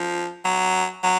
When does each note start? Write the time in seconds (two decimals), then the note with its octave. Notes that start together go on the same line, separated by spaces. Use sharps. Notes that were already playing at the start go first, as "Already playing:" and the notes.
Already playing: F3
0.45 F#3
1.03 F#3